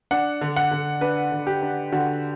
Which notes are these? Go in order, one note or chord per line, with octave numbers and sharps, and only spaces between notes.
D4 F#5
D3
F#5
D3
D4 B4
D3
G4
D4
D3 F#4